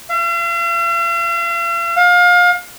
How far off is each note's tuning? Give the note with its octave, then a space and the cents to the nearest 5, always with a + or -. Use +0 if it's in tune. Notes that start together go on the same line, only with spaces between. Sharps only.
F5 -45
F5 +30